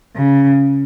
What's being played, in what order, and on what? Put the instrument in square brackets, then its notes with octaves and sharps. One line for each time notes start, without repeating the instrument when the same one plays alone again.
[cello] C#3